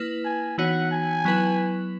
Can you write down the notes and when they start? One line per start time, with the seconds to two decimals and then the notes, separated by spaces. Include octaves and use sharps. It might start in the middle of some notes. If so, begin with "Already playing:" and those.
Already playing: A#3 E4 B4
0.25 G#5
0.58 E3 B3 D#4 F#4 C#5 F#5
0.91 G#5
1.25 F#3 B3 E4 B4